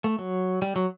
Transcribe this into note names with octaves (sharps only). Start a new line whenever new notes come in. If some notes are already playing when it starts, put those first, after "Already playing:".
A3
F#3
G3
F#3